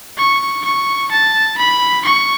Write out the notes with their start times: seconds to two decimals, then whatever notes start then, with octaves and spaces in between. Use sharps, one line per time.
0.18 C#6
0.65 C#6
1.11 A5
1.58 B5
2.05 C#6